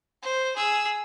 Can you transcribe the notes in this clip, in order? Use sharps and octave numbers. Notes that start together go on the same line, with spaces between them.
C5
G#4 E6